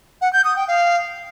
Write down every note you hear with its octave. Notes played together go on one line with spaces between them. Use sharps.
F#5
G6
D#6
G5
F5